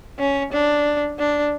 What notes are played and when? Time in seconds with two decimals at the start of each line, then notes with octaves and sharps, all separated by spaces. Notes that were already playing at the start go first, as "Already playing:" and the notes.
0.19 C#4
0.53 D4
1.19 D4